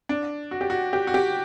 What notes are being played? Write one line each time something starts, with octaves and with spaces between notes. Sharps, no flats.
D4
F#4
G4
F#4
G4
F#4
G4